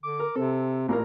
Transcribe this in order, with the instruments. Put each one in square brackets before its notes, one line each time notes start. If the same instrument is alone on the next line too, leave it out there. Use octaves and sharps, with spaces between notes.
[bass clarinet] D3 [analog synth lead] D6
[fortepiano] A#4
[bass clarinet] C3 [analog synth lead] C4 [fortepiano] A4
[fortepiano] A1 A#2 A#4 [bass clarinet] A#3